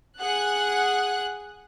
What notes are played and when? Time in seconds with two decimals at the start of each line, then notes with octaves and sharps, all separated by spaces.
0.20 G#4 F#5 F#6